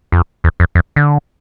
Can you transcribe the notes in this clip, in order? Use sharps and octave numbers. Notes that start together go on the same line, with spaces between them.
F2
E2
F2
F2
D3